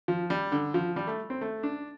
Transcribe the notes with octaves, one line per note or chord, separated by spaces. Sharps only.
F3
G3
D3
F3
G3
A3
C4
A3
D4